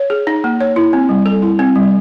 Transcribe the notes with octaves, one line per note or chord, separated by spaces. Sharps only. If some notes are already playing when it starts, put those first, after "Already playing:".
Already playing: C#5
G#4
D#4
A#3
C#5
E4
C4
G3
A4
E4
C4
G3